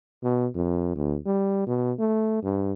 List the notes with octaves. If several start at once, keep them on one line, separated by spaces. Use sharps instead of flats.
B2
F2
D2
G3
B2
A3
G2